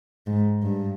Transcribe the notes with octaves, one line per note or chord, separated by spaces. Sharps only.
G#2
G2